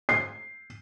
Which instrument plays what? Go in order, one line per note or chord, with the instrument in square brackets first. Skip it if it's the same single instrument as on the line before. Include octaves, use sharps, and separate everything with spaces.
[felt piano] C7